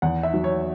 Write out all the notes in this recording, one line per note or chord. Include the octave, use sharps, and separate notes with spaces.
E2 F#5
E5
F#3
C#5